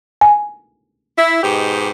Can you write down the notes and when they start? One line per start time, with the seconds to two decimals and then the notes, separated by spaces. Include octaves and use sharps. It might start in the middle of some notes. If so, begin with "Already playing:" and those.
0.21 G#5
1.17 E4
1.42 G#2 B2 G4